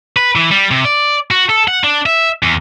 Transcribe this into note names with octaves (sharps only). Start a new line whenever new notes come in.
B4
E3
G3
C3
D5
F#4
A4
F#5
D4
E5
E2